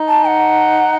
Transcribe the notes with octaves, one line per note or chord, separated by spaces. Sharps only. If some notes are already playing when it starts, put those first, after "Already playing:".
Already playing: D#4
A5
F#5